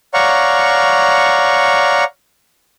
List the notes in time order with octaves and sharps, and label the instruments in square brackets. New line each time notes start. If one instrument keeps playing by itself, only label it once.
[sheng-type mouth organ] C#5 D5 F5 F#5 A#5 C#6